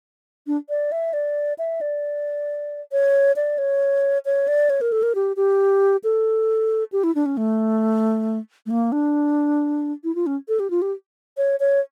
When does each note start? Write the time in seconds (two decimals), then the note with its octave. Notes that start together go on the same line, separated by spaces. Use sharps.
0.47 D4
0.69 D5
0.92 E5
1.13 D5
1.59 E5
1.81 D5
2.92 C#5
3.36 D5
3.58 C#5
4.25 C#5
4.48 D5
4.70 C#5
4.81 A#4
4.92 A4
5.03 A#4
5.15 G4
5.37 G4
6.04 A4
6.92 G4
7.04 E4
7.15 D4
7.26 C#4
7.37 A3
8.66 A3
8.70 A#3
8.92 D4
10.04 E4
10.15 F4
10.26 C#4
10.48 A4
10.60 G4
10.70 F4
10.82 G4
11.37 C#5
11.60 C#5